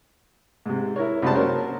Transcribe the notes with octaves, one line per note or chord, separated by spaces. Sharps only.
G#2 C3
E4 A#4 C#5
C2 F#2 G#3 C5 A5
F#3 A#3 C#4 A#4 C5